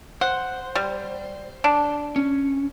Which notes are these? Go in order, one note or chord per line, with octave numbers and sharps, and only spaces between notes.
C5 F#5
G3
D4
C#4